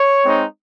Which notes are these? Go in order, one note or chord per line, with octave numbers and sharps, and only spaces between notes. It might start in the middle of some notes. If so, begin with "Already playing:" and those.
Already playing: C#5
G#3 C4 D#4